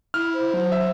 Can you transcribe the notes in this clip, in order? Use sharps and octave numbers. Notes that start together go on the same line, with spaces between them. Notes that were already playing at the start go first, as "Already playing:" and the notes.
E4 F6
C5
F#3
E5